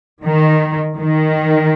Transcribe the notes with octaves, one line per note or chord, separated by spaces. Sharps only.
D#3
D#3